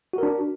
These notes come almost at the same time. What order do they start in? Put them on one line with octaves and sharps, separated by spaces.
F#4 A#4 D4